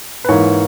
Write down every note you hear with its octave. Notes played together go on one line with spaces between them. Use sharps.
B4
G#2 E3 A#3 C#5